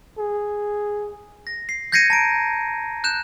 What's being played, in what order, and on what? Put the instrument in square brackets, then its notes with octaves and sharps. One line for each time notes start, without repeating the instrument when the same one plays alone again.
[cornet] G#4
[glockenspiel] A#6
C7
G6 G#6 A#6 C7 C#7 D#7
A5 A#5 D7
F#6 G6 E7